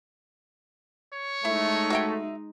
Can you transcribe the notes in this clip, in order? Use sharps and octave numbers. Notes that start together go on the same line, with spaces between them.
C#5
G#3 A3 D#4 E4
F#4 E5 G5